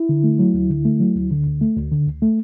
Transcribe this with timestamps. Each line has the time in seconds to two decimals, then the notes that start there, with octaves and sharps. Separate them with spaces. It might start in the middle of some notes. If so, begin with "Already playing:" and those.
Already playing: E4
0.09 D3
0.24 A3
0.39 F#3
0.54 D2
0.70 D3
0.85 A3
1.00 F#3
1.16 D2
1.31 D3
1.46 D2
1.61 A3
1.76 D2
1.92 D3
2.07 D2
2.22 A3